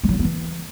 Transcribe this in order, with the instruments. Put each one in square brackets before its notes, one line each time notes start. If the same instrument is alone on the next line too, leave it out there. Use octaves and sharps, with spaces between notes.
[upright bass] G#3
F#3
C#4
B3
E3